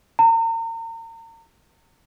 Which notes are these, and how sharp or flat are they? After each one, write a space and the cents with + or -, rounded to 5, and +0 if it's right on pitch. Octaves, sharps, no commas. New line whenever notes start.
A#5 -40